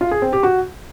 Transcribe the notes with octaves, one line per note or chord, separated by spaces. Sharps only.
F4
G#4
C4
G4
F#4